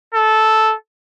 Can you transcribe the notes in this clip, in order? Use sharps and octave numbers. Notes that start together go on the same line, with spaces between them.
A4